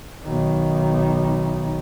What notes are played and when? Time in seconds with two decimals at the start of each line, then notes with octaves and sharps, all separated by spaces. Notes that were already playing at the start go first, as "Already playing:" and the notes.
0.24 B1 D#3